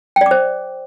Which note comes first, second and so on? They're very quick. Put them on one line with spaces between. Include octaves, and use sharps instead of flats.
G5 D5 D6 C5